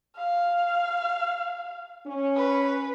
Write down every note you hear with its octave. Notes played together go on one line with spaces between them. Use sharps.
F5
C#4
B4